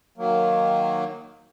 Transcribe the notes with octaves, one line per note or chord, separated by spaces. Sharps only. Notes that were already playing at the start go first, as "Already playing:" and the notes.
D#3 F#3 A#3